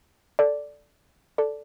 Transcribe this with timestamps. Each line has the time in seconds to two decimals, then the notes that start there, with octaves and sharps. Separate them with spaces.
0.39 A4 D5
1.38 A4 D5